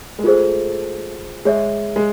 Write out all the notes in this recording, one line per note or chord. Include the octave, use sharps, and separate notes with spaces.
G#3
A3 F4 G#4 C5
G#3 G#4 C#5 E5
G#3